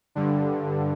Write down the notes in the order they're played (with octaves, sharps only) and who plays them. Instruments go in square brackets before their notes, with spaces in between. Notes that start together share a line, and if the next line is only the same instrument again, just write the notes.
[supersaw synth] G2 D3